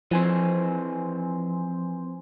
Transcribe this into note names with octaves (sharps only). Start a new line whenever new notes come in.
E3 F3 C4 G#5 C6